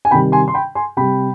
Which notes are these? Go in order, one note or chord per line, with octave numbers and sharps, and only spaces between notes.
G#5
C3 D#3 G3 G5 B5
G#5 C6
C6
G5 B5
G#5 C6
C3 G3 G5 B5